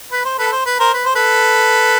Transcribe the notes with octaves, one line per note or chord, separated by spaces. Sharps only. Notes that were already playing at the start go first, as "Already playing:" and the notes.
B4
C5
A4 B4
C5
B4
A#4 C5
B4
C5
A4 B4